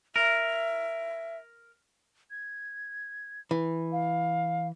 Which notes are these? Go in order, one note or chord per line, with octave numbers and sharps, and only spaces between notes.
A#4 E5
G#6
E3
F5